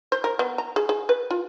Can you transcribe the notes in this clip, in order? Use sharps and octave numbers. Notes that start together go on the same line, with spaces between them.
C5
A#4
B3
A#5
G#4
G#4
B4
F4